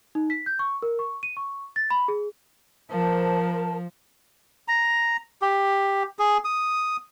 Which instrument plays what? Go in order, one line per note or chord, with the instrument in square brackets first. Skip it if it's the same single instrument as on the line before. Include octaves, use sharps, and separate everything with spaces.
[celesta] D#4
B6
G6
C#6
A#4
C#6
D#7
C#6
A6
B5
G#4
[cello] F3 [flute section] A#4 C5 A5
[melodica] A#5
G4
G#4
D#6